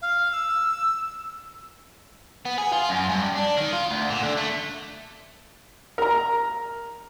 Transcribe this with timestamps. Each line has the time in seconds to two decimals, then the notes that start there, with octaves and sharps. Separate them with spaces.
0.01 F5
0.31 E6
2.46 B3
2.58 G#4
2.72 F4
2.89 F#2
3.10 G2
3.36 D4
3.58 D#3
3.73 F4
3.91 D2
4.10 A#2
4.23 D3
4.37 A3
5.98 A#4 A#5